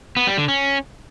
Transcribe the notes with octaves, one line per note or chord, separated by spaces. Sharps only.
B3
G3
D3
C#4